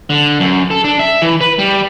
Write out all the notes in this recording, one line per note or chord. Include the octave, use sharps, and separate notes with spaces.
D3
F#2
A4
D4
E5
E3
B4
G3